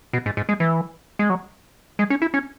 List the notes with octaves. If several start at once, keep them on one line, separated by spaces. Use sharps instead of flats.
B2
G#2
G#2
G#3
E3
G#3
F#3
G#3
C#4
E4
C#4